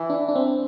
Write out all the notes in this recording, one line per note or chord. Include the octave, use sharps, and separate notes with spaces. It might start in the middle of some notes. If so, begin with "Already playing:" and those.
Already playing: E3
D4
D4
C4